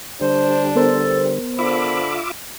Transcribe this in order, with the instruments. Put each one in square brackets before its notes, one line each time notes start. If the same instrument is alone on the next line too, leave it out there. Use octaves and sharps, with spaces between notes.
[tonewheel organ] D3 G3 [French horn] D4 [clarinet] C5
[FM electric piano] B3 A#4 C5 [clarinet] A4
[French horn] D3 [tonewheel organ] F4 E5 D6 [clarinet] B5